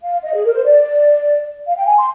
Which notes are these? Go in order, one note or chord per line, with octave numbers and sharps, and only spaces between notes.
F5
D#5
G#4
A#4
C5
D5
F5
G5
G#5
C6